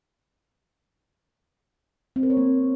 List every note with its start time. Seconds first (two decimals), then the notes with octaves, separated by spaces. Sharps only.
2.16 C4
2.23 A#4
2.30 C#5
2.37 A#3